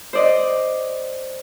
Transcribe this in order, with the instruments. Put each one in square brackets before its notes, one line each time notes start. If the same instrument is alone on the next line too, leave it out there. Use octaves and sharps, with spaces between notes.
[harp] C5 D5 D#5